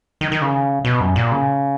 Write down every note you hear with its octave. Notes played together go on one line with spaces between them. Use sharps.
D#3
D#3
C#3
B2
F#2
A#2
C#3